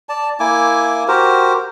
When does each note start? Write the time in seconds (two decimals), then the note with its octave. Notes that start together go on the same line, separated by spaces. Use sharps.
0.09 D5 A5
0.40 A#3 E4 G#5 D6
1.08 F#4 G4 A#4 C5